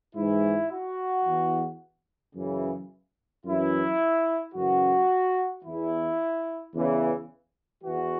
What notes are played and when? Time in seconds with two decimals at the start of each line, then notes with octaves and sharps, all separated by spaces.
0.15 G#2 E3 E4
0.70 F#4
1.25 E2 E3
2.35 F#2 C#3 E3
3.44 F#2 E3 E4
4.54 F#2 C#3 E3 F#4
5.64 E2 E3 E4
6.74 E2 C#3 E3
7.84 E2 E3 F#4